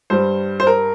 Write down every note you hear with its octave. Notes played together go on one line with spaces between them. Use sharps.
G2 G3 C5
C5
A#4